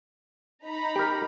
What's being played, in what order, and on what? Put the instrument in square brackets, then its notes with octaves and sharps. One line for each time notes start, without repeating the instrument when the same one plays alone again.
[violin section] D#4 A#5 B5
[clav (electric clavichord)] G4 A#4